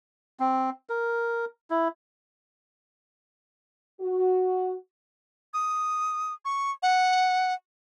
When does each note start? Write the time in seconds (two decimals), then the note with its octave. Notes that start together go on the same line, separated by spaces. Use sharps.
0.40 C4
0.89 A#4
1.70 E4
4.00 F#4
5.54 D#6
6.45 C#6
6.83 F#5